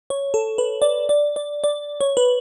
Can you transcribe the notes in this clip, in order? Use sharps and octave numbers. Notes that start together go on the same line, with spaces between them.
C#5
A4
B4
D5
D5
D5
D5
C#5
B4